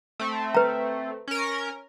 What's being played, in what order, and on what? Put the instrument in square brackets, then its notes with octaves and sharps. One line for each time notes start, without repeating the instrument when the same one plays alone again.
[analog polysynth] A3 C4
[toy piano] B4 A#5
[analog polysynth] C#4 A#4